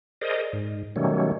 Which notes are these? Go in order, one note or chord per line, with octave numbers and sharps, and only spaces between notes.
G#4 A#4 C5 D5 D#5
G#2
B2 D#3 F#3 G3 A3 C#4